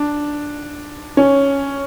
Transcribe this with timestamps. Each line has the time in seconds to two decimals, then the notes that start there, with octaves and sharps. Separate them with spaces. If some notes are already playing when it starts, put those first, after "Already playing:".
Already playing: D4
1.17 C#4